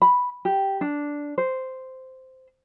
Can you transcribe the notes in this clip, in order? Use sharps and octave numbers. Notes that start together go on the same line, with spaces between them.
B5
G4
D4
C5